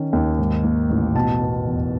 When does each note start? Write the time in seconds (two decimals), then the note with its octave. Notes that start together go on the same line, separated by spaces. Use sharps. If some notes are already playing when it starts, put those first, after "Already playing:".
Already playing: D#3 C#4
0.13 D#2
0.39 G#2
0.64 A#3
0.90 A1
1.15 B2 A5
1.41 B3
1.66 E2